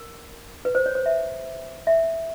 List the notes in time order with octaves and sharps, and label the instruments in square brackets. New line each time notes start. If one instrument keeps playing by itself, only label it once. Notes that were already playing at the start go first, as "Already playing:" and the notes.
Already playing: [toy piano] A#4
B4
C5
C#5
C5
E5
E5